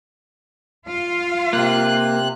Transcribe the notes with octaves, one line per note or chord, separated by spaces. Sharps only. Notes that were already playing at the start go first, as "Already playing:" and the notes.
F4 F5
C3 A#3 F#6